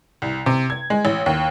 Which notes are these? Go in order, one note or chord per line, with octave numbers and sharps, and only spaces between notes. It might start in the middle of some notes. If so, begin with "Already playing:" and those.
C2
C3
G#6
G#3
A1
D#2